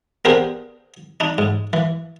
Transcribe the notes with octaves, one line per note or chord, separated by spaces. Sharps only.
B3 D4 G4 G#4 A#4 C5
D4 D#4
G#2
E3